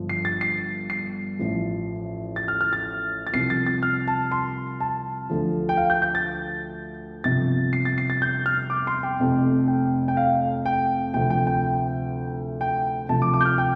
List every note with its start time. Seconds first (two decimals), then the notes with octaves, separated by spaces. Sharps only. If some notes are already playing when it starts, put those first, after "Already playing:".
Already playing: G1 G2 D3 F3
0.09 C7
0.25 A6
0.41 C7
0.90 C7
1.39 A1 A2 F3
2.36 A6
2.48 F6
2.61 F6
2.73 A6
3.27 A6
3.33 C2 C3 F3 C7
3.50 A6
3.67 A6
3.83 F6
4.08 A5
4.32 C6
4.80 A5
5.30 D2 D3 F3
5.69 G5
5.77 F5
5.90 G6
6.02 G6
6.15 A6
7.24 G1 F2 C3 F3 A6
7.73 C7
7.85 A6
7.98 C7
8.10 A6
8.22 G6
8.46 F6
8.70 D6
8.87 C6
9.03 G5
9.20 F1 F2 C3
9.68 G5
10.08 G5
10.17 F5
10.66 G5
11.14 D2 C3 F3 G5
11.30 G5
11.47 G5
12.61 G5
13.09 D2 C3 F3 A5
13.22 D6
13.34 D6
13.41 G6
13.45 F6
13.58 G5